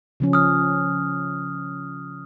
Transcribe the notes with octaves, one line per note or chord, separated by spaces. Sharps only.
C#3 F3 C#4
D#6 F6